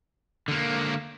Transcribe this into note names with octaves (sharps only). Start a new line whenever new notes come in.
D3 A#3